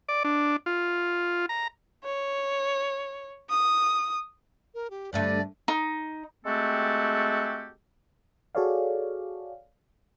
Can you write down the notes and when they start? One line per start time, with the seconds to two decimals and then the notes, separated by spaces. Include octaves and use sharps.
0.09 D5
0.24 D4
0.66 F4
1.49 A#5
2.04 C#5
3.50 D#6
4.74 A#4
4.90 G4
5.13 G2 D3 A3 D5
5.68 D#4
6.45 G#3 A3 C4 F#4 G4 A4
8.55 F#4 G#4 A4 C#5 D5 F5